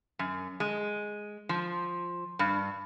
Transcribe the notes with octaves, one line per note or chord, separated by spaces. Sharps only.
F#2
G#3
F3
G2